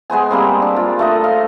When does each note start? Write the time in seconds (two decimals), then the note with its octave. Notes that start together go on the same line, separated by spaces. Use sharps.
0.10 G#3 B3 C5 G#5
0.31 G3 A#3 C4
0.62 D4
0.76 F4
0.99 A3 A4 D#5
1.24 F5